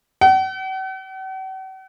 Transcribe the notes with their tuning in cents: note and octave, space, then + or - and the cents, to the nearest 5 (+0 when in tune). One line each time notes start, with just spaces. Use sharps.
F#5 +45